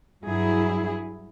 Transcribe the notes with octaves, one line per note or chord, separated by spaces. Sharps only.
G2 F#3 E4 G#4